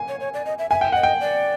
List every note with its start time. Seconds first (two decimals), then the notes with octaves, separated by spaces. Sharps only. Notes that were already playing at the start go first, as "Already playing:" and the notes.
Already playing: G#5
0.08 C#5
0.20 C#5
0.34 D5
0.45 D#5
0.59 E5
0.70 E5 G#5
0.81 G5
0.92 D#5 F#5
1.03 G5
1.21 D5